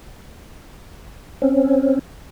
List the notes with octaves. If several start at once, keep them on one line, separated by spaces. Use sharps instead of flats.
C4 C#4